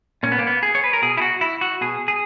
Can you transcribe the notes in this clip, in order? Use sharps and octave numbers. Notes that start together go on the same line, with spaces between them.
A#2 C#4
B3
A#3
B3
G#4
C#5
B4
A#4
B2 G#4
E4
F#4
E4
F#4
B2 G#4
G#4